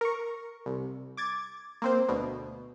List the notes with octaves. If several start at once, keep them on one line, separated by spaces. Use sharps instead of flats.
A#4 C#6
C2
D6 G#6 A6
A#3 C4 C5
D2 B2